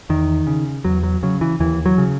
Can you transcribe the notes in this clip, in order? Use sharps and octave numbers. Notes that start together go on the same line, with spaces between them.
E2 D#3
C#3
E2 F#3
F#3
C#3 F#3
E3
D#2 E3
F#3
C#3